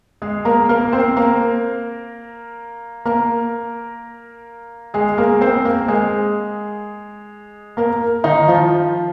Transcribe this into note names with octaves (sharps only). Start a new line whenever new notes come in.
G#3 G#4
A#3 A#4
A#3 A#4
C4 C5
A#3 A#4
A#3 A#4
G#3 G#4
A#3 A#4
C4 C5
A#3 A#4
G#3 G#4
A#3 A#4
D#3 D#4
F3 F4